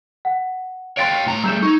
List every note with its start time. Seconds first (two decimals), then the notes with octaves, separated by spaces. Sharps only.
0.25 F#5
0.97 C#5 F5 G5 C6 A6 D7
1.27 A2 A#5
1.44 G3 A3 E6 G6 E7
1.62 D#4 C#6 G#6